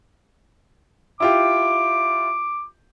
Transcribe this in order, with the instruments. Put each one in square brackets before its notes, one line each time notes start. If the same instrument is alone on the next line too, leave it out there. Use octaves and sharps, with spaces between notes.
[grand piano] E4 F4 G4 [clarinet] D6